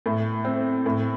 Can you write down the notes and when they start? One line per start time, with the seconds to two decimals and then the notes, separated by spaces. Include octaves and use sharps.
0.06 A2
0.45 C4
0.86 A2